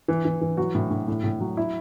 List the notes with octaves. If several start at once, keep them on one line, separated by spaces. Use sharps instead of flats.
E3
E3
E3
F#3 F#4
A2
A2
A2
A2
F#3
E4